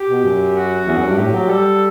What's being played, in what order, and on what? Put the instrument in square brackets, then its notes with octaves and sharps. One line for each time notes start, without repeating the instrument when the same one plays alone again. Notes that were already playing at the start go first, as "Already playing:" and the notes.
Already playing: [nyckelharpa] G4
[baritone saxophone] B2
F#2
[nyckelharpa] F#4
[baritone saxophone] E2
F#2
G2
[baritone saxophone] A2 [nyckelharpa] G4
[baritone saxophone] F#3
[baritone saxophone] G3 [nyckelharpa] A4